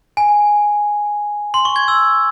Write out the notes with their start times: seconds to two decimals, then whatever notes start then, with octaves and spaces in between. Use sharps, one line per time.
0.17 G#5
1.54 C6
1.65 C#6
1.76 G#6
1.88 E6